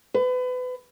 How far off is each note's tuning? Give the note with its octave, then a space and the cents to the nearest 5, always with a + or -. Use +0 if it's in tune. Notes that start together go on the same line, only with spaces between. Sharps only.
B4 +30